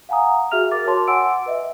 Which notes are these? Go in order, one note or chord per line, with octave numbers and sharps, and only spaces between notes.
F5 F#5 G#5 A#5 D#6
F#4 G#4 E5 F6 F7
A#4 D6 A6
F#4 A#4 C#5 A5 C6 D6
F#5 G#5 C6 D6 E6 D7
B4 D#5 E5